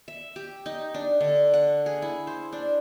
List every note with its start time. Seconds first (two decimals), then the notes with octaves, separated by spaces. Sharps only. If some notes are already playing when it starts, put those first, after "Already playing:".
0.08 E5
0.36 G4
0.66 D#4
0.94 D4
1.20 D3
1.54 F#5
1.86 G#4
2.02 E4
2.27 C5
2.52 D4